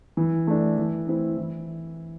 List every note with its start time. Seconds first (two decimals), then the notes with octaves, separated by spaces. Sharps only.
0.17 E3
0.47 A3 D4
0.78 E3
1.07 A3 C4 E4
1.37 E3